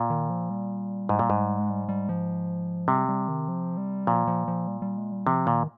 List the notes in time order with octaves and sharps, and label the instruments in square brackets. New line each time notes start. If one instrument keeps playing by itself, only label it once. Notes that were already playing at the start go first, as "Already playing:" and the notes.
Already playing: [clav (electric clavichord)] A#2
[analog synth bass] D#3
F3
G3
[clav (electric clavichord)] G#2
A#2
G#2
[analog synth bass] G#3
G3
G3
F3
[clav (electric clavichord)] C3 [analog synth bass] G3
[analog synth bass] G3
D#3
F3
G3
[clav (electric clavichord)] A#2 [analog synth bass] F3
[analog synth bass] F3
F3
G3
G3
G#3
G3
[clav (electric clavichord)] C3 [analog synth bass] F3
[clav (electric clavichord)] A#2 [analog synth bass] D#3